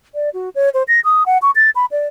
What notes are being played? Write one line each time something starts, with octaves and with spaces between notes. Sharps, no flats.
D5
F#4
C#5
C5
A#6
D#6
F#5
C#6
A6
B5
D5